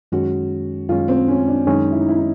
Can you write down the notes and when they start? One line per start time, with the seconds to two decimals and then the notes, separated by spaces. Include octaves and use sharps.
0.12 F#2 D#3 G#3 C#4 F#4
0.89 F#2 D#3 G#3 C#4 F4
1.08 C4
1.28 C#4
1.48 D4
1.67 F#2 D#3 G#3 C#4 D#4
1.92 E4
2.00 D#4
2.09 E4
2.18 D#4